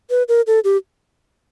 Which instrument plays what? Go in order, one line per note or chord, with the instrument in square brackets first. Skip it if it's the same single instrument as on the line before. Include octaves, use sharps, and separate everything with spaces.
[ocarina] B4
A#4
A4
G4